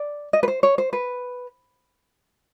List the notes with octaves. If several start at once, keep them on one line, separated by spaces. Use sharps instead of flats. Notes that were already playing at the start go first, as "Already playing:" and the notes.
Already playing: D5
D#5
B4
C5
C#5
C5
B4